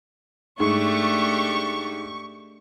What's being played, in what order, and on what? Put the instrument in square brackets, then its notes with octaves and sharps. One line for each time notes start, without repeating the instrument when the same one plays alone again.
[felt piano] G#2 [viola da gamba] A3 D4 G4 [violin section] C#6